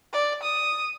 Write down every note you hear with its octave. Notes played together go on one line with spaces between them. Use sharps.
D5
D#6